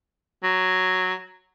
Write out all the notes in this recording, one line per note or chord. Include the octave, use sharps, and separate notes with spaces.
F#3